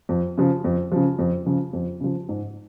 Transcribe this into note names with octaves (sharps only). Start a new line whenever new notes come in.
F2
C#3 F3
F2
C#3 F3
F2
C#3 F3
F2
C#3 F3
G#2